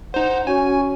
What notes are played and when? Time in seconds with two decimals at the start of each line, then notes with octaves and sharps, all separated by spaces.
0.14 D#4 C5 F#5
0.47 C#4 F#4 G#5